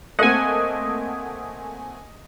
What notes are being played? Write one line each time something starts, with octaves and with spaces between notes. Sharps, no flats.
A3 A#3 C4 D#5 F#5 G#5